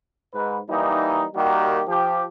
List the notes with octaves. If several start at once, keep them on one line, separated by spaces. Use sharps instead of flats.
G#2 B4
E3 G3 A#3 D#4
D#3 G3 A#3 F#4 G4 A#4
F3 G4